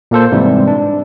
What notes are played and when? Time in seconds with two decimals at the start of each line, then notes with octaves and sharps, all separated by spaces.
0.11 A#2 A#3 A4 C5
0.32 G#2 C3 E3 G3
0.68 D4